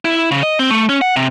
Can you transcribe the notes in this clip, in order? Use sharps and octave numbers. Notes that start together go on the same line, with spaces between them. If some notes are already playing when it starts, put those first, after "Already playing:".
E4
C#3
D#5
C4
A3
C#4
F#5
C3